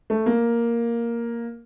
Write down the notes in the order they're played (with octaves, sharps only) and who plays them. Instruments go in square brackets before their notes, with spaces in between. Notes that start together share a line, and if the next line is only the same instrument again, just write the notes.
[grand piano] A3
A#3